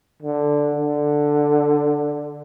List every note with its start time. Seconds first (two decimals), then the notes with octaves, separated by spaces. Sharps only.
0.22 D3
0.75 D3